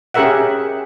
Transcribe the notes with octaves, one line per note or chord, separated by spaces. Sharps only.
C#4 G4 G#4 A#4 E5 F#5